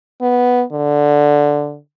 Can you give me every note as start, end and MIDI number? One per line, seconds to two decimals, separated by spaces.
0.22 0.64 59
0.72 1.78 50